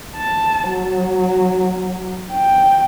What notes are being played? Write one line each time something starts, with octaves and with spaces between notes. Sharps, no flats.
A5
F#3
G5